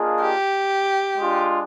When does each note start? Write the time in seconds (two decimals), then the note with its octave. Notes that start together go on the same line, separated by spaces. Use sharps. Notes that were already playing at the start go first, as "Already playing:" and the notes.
Already playing: A#3 D4 F4 G#4 D#5
0.21 G4
1.18 G#3 D4 F4